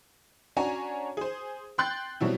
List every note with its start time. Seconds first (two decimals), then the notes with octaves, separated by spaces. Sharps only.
0.57 C#4 D4 F#4 C#5 G#5 A#5
1.17 G#4 C5
1.78 G5 C6 F#6 G6 A6
2.20 B2 F#3 G3 C4 E4